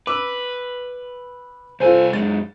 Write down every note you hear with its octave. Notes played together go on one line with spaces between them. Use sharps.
B4 D6 E6
C2 F4 A4 C5 G#5
F#2 G#3 A6